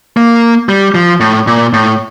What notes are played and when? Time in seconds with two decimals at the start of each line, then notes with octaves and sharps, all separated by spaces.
0.17 A#3
0.69 G3
0.95 F3
1.20 A2
1.47 A#2
1.73 A2